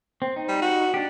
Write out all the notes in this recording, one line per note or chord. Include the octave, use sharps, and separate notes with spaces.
C4
D#4
G3
F#4
D4 G4